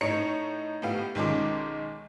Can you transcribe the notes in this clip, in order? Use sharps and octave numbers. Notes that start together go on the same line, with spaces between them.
A2 D#4 C#5 C#7
A2 B3 G4 F5
B1 D#3 G#3 C#4 D#4 D6